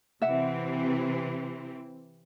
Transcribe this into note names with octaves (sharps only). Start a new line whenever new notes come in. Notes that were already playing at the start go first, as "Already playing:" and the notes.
C3 E3 C4 E5 F#5